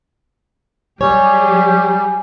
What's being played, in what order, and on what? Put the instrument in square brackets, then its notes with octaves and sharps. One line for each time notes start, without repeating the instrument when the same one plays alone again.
[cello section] F#3 G4 G#4 [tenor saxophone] G3 [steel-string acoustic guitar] C#5 [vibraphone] G#5